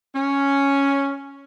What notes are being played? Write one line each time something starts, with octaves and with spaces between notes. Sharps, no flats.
C#4